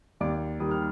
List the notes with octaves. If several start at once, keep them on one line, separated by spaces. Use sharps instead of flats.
D#2 D5 D6
D#3 G3 D#6
F6